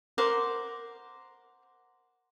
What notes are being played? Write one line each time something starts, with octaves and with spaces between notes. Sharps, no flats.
A#4 C5 F#5 D6